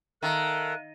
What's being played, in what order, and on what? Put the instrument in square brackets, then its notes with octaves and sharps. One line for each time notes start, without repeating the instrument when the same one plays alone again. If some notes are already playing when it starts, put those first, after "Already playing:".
[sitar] D#3 [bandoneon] A4 A#4 [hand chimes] E5 F5 A#5 [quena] F#6